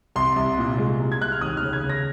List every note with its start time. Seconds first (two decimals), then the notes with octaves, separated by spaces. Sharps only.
0.16 C2 C6
0.36 C2
0.58 A#2
0.78 G#3
0.99 C2
1.12 G#6
1.21 C2 F#6
1.32 F6
1.41 D#2 D#6
1.57 F6
1.63 C#3
1.73 G#6
1.84 C#3
1.89 A#6